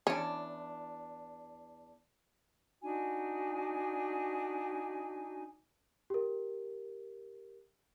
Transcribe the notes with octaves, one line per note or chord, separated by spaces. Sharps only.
E2 C#4 D4
D4 D#4 F#4 G#5
G4 A#4